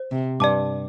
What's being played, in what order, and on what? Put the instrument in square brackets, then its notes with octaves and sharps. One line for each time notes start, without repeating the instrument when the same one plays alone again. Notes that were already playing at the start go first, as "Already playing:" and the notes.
Already playing: [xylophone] C5
[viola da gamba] C3
[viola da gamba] G2 [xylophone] D5 A5 D6